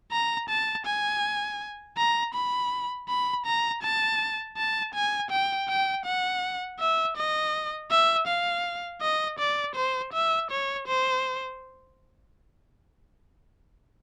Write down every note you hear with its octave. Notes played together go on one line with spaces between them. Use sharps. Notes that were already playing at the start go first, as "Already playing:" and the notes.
A#5
A5
G#5
A#5
B5
B5
A#5
A5
A5
G#5
G5
G5
F#5
E5
D#5
E5
F5
D#5
D5
C5
E5
C#5
C5